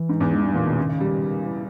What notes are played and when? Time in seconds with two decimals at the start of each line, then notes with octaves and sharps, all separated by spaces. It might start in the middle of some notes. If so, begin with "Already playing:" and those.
Already playing: E3
0.09 G#2
0.20 E2
0.31 G2
0.35 G#3
0.43 G2 G3
0.54 A#2 E3
0.66 B2 D#3
0.77 C#3
0.89 C#3
1.00 G3
1.46 E3